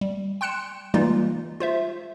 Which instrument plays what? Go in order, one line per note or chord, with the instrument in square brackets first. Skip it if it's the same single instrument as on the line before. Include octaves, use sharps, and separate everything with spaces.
[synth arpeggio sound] G3
G5 C6 F#6 C#7 E7
E3 G3 G#3 A#3 D#4 F4
F4 C5 E5